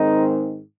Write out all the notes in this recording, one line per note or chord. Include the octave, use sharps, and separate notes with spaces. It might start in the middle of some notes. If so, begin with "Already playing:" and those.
Already playing: G#2 D#3 G#3 C4 D#4